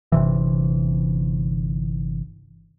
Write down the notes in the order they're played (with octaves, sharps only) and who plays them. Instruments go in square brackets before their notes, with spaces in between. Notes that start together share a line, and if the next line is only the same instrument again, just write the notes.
[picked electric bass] G1 C3 E3